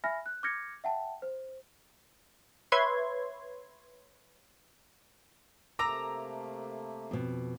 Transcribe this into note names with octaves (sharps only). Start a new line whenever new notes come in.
E5 G#5 B5 F6 A#6
F#6
D6 F6 G6 G#6 A#6 C#7
E5 F#5 G5 A5
C5
B4 C#5 E5 C6 G#6
C3 A3 A#3 A#5 D6 E6
F2 B2